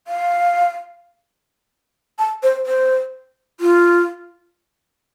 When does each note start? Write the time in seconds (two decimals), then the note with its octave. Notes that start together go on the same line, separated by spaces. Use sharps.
0.08 F5
2.19 A5
2.43 C5
2.66 C5
3.60 F4